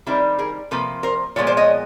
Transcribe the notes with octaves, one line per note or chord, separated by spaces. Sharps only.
D#3 G3 C4 D4 E4
G#4 A#4
C3 F3 A#3 A4 B4
A#4 C5
A#2 F3 G#3 B3 C#5
C5 D5
C#5 D#5